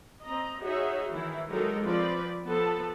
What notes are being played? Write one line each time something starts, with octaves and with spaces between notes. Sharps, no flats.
C4 D#5 A#5
D#4 F#4 G#4 C#5 D#5 E5
D#3 E3 E4
F#3 G#3 D#4 G4 A4 A#4
F3 C4 B4 D5
F3 B3 A4 B4 A5